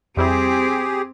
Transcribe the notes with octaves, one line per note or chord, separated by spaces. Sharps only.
F2 G3 C4 E4 G4 G#4